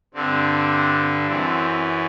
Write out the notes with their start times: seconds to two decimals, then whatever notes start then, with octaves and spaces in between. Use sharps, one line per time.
0.14 G2 D3 C4
1.27 F#2 E3 C4